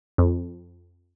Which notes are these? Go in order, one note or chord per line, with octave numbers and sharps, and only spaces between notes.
F2